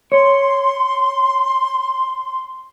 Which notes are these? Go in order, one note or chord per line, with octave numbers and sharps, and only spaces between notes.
C#5 C6